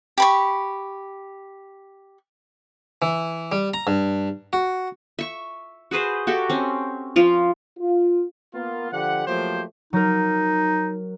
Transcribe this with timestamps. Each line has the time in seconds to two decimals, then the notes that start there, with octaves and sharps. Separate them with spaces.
0.18 G4 B5 C#6
3.02 E3
3.52 G3
3.74 A#5
3.87 G2
4.53 F#4
5.19 E5 C#6
5.91 F#4 G#4 B4 C5
6.27 F#4 G4 A4 E5
6.50 C4 C#4
7.16 F3 F4
7.79 F4
8.54 A#3 B3 F4
8.92 D3 F3 G4 F#5
9.27 F3 F#3 A3 A#3 G4 C5
9.93 F#3 D#4 A#4